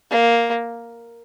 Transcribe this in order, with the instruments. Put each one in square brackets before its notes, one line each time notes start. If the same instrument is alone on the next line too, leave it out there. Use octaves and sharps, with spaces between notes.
[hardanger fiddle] A#3